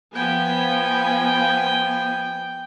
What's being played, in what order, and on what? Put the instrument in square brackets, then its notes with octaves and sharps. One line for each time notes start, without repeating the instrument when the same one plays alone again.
[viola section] F3 B3 G#5 [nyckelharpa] G5